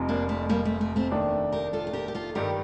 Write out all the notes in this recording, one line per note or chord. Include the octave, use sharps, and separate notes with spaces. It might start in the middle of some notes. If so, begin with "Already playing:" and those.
Already playing: F1 F2 C3
A#3 D4
A3
G3 A#3
A3
A3
A3 C4
D#2 D#3 A3 D4
G4 A#4
F4 A4
A4
G4 A#4
G4
F4 A4
G2 D#3 G3 G4 A#4